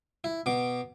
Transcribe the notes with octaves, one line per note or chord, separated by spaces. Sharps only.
E4
B2 D6